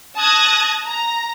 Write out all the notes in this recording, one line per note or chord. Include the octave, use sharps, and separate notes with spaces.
A5 D#6 F#6 G#6 A#6
A#5